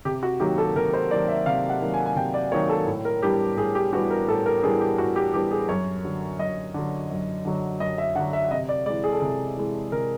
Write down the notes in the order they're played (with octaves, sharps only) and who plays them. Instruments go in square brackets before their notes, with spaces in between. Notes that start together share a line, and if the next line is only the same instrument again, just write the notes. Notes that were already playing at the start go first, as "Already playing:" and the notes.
[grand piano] C3 G4
F#4
D#3 F#3 A#3 G4
A4
C3 A#4
C5
D#3 F#3 A#3 D5
E5
C3 F5
F#5
D#3 F#3 A#3
G#5
G#5
C3 G5
D5
D#3 F#3 A#3 C#5
A4
A2
A#4
E3 G3 B3 D4 G4
A2 G#4
G4
E3 G3 B3 D4 F#4
A#4
A2 A4
A#4
E3 G3 B3 D4 G#4
G4
A2 F#4
G4
E3 G3 B3 D4 G4
G#4
F#2 C#5
D3 F#3
F#2 D#5
D3 F#3
F#2
D3 F#3
F#2 D#5
E5
D3 F#5
F#3
E5
C3 D#5
D5
G#3 D5
E3
G#4
A4
C3 G#4
E3 G#3
C3 A#4